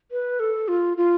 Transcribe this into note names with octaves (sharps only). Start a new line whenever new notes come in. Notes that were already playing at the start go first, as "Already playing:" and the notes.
B4
A4
F4
F4